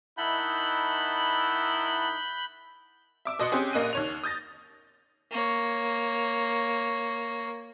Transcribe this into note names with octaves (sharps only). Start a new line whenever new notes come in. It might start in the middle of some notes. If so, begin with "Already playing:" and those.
D#3 D#4 E4 F#5 A5 B5 F#6 G6
E5 D6 E6
B2 D#5 C6 F#6 C#7
C4 C#4 G4 G#4
A#1 A#3 D#5 F#6 D#7
D#2 C#5 F7
D#6 G6 A6 A#6
A#3 C#5